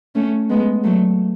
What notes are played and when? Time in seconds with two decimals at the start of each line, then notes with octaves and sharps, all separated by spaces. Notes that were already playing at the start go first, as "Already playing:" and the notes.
0.15 A3 C#4
0.49 G#3 B3
0.83 F#3 A3